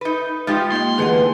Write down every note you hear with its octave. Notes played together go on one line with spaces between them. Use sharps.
D#4 B4
F3 G#3 D#4 G4 C6
A#3 D#5 G5 C6
D3 E3 A3 G#4 D#5 F#5